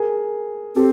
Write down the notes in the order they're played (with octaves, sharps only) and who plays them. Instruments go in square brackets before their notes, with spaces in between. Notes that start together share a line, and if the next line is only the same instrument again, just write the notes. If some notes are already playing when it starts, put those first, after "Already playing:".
Already playing: [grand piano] G#4 A#4
[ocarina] C4 [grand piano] G4 A4